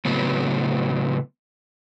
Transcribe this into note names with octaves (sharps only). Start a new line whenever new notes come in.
A2 C#3 F#3 B3